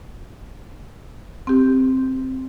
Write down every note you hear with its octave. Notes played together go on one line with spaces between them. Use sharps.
C4 G4